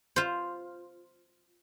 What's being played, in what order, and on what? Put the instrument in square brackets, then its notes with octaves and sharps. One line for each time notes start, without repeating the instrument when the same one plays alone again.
[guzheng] F4 C5